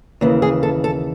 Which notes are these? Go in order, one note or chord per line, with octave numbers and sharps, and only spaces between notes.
D#2 C#3 E3
G#4
A4
A4